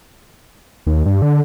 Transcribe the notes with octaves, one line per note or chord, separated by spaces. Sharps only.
D#2
G2
D3